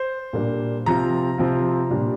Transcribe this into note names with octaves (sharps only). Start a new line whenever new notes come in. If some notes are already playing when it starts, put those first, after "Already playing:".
Already playing: C5
A#2 G3 A#3 D4
C3 F3 C4 F4 A#5
C3 F3 C4 F4
A#2 G3 D4 F4